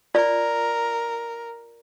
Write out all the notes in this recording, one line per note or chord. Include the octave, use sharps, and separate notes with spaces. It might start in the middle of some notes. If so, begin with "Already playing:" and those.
F4 A#4 D5